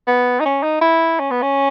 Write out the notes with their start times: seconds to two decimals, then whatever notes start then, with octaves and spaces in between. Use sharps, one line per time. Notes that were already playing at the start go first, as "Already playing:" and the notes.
0.07 B3
0.40 D#4
0.45 C#4
0.63 D#4
0.81 E4
1.20 C#4
1.31 B3
1.42 C#4